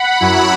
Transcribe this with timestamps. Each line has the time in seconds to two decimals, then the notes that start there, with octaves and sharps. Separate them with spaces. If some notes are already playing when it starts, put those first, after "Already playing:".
Already playing: F#5 B5
0.20 F#2 F#3 E4